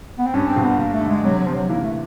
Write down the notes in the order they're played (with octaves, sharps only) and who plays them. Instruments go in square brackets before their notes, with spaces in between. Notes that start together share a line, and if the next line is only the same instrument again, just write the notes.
[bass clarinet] B3
C4
[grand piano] G2 [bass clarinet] C#4
[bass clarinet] C4
[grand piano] G1
[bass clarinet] B3
[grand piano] G1 [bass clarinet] A#3
[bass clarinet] A3
[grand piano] D3
[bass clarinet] G#3
[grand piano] C3 [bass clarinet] F#3
[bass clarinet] F#3
[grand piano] C3 [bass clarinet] F3
[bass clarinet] F#3
[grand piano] E3 [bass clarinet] A#3
[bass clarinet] A3